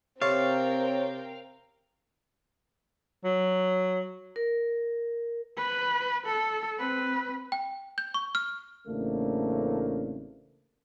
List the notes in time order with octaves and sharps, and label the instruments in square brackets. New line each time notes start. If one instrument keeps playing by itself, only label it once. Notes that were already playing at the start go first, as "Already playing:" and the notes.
[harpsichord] C3 A4 A5 [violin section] C4 A#4 G5 [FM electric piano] C#5 [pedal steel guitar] F5
[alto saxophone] F#3
[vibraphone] A#4
[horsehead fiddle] B4
A4
C4 B4
[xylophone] G5
G6
C#6
F6
[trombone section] A1 C#3 A3 A#3 C4 D4